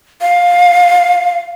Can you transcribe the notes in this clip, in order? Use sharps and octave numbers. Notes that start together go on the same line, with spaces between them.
F5